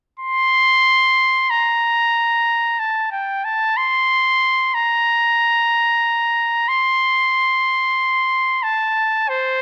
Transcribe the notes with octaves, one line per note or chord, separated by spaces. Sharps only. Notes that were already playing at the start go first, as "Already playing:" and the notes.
C6
A#5
A5
G5
A5
C6
A#5
C6
A5
C5